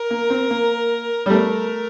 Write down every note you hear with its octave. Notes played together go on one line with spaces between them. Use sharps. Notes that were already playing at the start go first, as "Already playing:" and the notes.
Already playing: A#4
A#3
C4
A#3
G3
A3 A#4